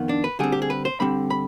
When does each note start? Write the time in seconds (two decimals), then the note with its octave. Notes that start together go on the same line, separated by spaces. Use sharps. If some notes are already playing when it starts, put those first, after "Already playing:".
Already playing: F2 D#3 B3
0.09 D4
0.24 B4
0.39 D3 G3 C4 G#4
0.52 G4
0.62 G#4
0.70 B4
0.85 C5
1.00 D3 G3 C4 B5
1.30 B5